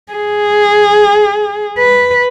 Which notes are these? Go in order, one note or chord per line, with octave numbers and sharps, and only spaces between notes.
G#4
B4